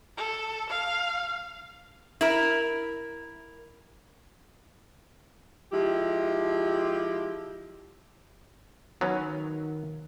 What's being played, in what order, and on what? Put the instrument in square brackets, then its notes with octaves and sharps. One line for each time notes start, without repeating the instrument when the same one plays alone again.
[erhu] A4
F5
[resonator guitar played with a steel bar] E4 A#4
[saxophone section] F3 G#3 E4 G4
[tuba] D#3 [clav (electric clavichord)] F#3 B3 C#4